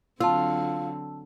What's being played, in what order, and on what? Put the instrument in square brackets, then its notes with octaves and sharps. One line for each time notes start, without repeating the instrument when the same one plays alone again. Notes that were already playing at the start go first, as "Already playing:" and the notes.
[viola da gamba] D3 F#3 C4 [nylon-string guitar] F4 [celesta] A5 E6